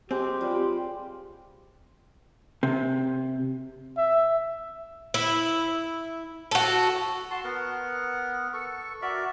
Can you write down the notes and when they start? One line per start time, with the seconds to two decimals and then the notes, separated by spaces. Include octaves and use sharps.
0.11 G#3 C4 G4
0.41 G3 F4 D5
2.63 C3
3.98 E5
5.14 E4
6.51 F#4 A4
7.31 F#4 A5 C6
7.44 B3 A#4 F#5
8.53 A4 C#6
9.02 F#4 A#4 D5 E5